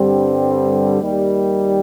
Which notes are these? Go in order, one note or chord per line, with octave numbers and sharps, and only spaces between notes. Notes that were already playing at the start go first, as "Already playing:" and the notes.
Already playing: G2 D3 G3 C4
D#2 D#3 G3